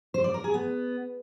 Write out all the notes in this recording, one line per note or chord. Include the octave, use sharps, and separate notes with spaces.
C5
D5
A#4
G#4
B3